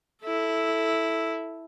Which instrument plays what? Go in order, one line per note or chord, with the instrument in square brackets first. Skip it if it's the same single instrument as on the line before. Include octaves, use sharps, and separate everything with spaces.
[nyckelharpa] E4 A4